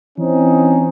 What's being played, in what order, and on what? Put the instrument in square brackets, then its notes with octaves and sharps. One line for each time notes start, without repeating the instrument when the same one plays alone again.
[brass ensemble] E3 C4 C#4 D#4